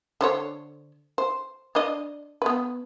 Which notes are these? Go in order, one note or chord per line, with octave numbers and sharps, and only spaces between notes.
D3 C5 C#5
C5
D4 D5 D#5
B3 B4